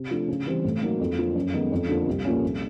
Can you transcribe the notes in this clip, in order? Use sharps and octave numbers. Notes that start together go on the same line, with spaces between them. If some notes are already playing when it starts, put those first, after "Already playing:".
Already playing: C3
F3 A3 D4
C#3
E3 G3 C4
A2
F#3 A#3 D#4
F2
D3 F3 A#3
F#2
D#3 G#3 B3 D#4
F2
D3 F3 A#3
C2
A#2 F3 A#3 C#4
C2